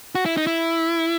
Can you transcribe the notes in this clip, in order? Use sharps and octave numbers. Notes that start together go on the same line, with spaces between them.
F#4
E4
D#4
E4